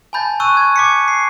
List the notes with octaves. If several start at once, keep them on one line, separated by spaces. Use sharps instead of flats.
G#5 A5 B5 G6 A6
C#6 E6 F#6 D#7
G#6
D6 B6 C#7
C7